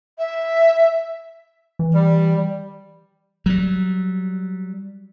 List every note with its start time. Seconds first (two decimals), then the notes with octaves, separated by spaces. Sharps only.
0.18 E5
1.79 E3
1.93 G3
3.46 F#3 G3